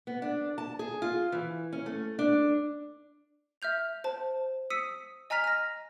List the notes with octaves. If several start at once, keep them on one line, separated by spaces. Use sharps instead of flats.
B3
D4
A5
G#4
F4
E3
C#4
A3
D4
E5 F6 G6 F7
C5 A5
D#6 E6 B6 C#7 D#7
D#5 G#5 A#5 F6 B6 F7
F6 A#6